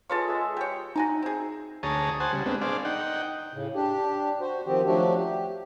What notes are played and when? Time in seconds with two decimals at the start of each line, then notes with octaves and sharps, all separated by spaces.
0.10 F4 G#4 A4 B4 C#5 D#5
0.28 G#3 G#4 E5
0.57 G4 C#5 G5
0.96 D#4 F#4 G#5 A#5
1.23 C4 G#4
1.83 D2 G#4 C#5 A5 A#5 D#6
2.20 C5 F#5 G#5 A5
2.33 C#3 G3
2.46 G#3 B3 C4 D4
2.61 D4 G#4 C5 D5 F5
2.85 D#4 F#5 G5
3.54 A2 C#3
3.75 D4 G4
4.40 F#4 C5
4.66 D#3 F3 C4 G4
4.86 F3 F#3 A3 D4 F#4 G4
5.17 G4